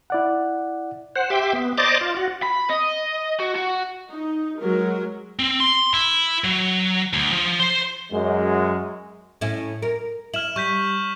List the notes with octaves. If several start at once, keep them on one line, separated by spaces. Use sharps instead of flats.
E4 D5 F#5
C5 F#5
G4 E5 G5 C6 D6
B3
C5 D5 D#5 A#5 D6 A6
F4
F#4
B5
D#5
F#4
F#4
D#4
F#3 G#3 A#4
C4
C6
E4
F#3
D2
F3
C5
F#2 G#3
A2 C#4 E4
A#4
E4 F6 E7 F#7
G3 C#6 G6 B6